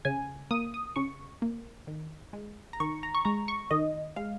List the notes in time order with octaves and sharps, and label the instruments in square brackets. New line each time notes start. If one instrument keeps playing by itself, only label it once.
[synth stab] C#3 G#5
A#3 D#6
D#6
C#3 C#6
A#3
D#3
G#3
A#5
D#3 C#6
A#5
C#6
G#3 A#5
C#6
D#3 D#5
G#3 F5